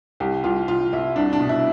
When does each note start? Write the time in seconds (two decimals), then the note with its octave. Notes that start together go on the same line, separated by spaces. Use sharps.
0.20 C2 G4
0.44 C2 F4
0.68 C2 F4
0.93 C2 E4
1.16 C2 D4
1.33 D4
1.40 B2
1.49 E4